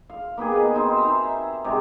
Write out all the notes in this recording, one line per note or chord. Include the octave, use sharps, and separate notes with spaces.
F5
A#3 B3 G4 G#4
B2 G#4 B4
C4 D#4 C5 D6
E5 A#5
C3 G#3 F#4 G4